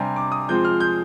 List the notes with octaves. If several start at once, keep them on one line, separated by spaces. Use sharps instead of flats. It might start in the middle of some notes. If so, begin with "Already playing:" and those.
Already playing: C3 G3 D4 G#5
D6
D#6
F3 G#3 C4 G6
F6
G6